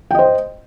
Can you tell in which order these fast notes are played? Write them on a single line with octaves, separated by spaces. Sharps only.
G5 D#5 C5